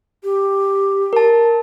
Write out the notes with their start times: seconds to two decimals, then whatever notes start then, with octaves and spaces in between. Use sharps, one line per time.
0.23 G4
1.13 A#4 A5